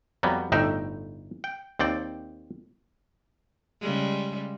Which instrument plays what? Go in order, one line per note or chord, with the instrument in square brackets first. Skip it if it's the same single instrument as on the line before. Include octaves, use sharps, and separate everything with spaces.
[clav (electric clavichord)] F2 F#3 G3 B3
G1 A2 D#4 E5 G5
G5
D#2 C4 D5 G5
[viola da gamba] C#3 G3 G#3